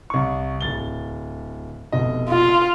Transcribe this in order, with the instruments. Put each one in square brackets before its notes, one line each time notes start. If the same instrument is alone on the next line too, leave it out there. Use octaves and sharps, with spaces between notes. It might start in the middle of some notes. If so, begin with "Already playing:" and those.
[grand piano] C2 C#6
D1 A6 G7
F1 B2 D#5
[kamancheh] F4